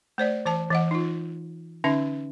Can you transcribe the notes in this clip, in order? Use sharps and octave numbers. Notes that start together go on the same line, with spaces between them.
A3 C5 D5
E3 C5 A5
E3 D#5 F#5
D#4 F4
D3 C#4 D#4 E5